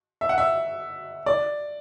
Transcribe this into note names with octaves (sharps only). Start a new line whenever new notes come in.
E5
F#5
E5
D5